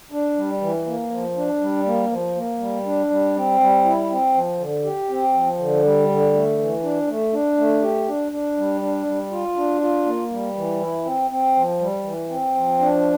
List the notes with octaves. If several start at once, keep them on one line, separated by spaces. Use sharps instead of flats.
D4
G3
E3
A#3
F3
D4
G3
A#3
F3
A#3
G3
D4
G3
C4
G3
E4
C4
F3
D3
G4
C4
F3
D3
G3
D3
A3
E3
D4
A3
D4
A3
G4
D4
D4
G3
D4
G3
F4
D4
F4
A#3
G3
E3
E4
C4
C4
F3
G3
E3
C4
F3
D4